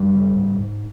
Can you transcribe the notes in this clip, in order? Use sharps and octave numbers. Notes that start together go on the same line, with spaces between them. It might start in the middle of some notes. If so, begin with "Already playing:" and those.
Already playing: F#2 G3
C#3
G#2
G#2